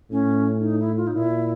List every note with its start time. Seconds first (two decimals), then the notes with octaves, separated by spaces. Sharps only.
0.11 A2 C#4
0.59 D4
0.64 D#4
0.80 E4
0.97 F4
1.07 D#4
1.14 A#2 E4